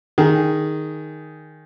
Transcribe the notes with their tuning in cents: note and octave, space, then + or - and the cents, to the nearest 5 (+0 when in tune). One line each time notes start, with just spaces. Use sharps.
D#3 +0 G#4 +0